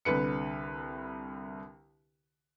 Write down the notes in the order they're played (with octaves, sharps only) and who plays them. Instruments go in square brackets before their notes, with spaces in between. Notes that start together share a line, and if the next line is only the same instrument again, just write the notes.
[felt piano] C2 D3 B4 C#7